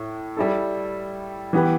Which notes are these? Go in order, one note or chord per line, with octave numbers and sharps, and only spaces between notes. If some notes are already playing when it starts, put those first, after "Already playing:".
Already playing: A2
G3 E4 A4
E3 B3 G4 B4